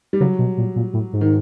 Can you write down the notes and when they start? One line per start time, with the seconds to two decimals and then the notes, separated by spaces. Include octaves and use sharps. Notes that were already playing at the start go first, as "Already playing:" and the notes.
0.13 G3
0.20 C#3 F#3
0.39 B2
0.58 A#2
0.76 A#2
0.93 A2
1.13 G#2
1.21 D#3